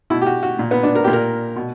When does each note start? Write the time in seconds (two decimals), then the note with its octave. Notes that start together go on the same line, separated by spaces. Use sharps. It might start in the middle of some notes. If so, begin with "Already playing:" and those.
0.10 B2 E4
0.22 G4
0.26 F#4
0.43 F#4
0.59 A#2
0.71 B3
0.83 D4
0.95 A#4
1.04 A#2 G4
1.13 A#4
1.56 B2